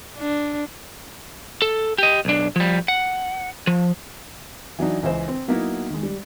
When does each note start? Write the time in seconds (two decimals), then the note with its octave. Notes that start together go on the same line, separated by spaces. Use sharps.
0.18 D4
1.62 A4
1.98 G4 D#5
2.25 B1 D4
2.56 F3 G3
2.88 F#5
3.67 F3
4.79 E3 F#3 D4 D#4
5.03 C#2 E3 C5
5.28 C4
5.48 F#3 A#3 B3 D#4 E4
5.90 D#3 G#3
6.03 G3